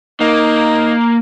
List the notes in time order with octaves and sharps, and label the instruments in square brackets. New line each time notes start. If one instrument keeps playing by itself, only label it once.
[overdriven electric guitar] A#3 [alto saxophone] D#4